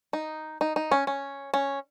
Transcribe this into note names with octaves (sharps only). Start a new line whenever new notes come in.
D#4
D#4
D#4
C#4
C#4
C#4